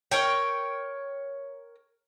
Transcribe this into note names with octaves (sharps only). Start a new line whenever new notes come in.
A#4 C#5 G5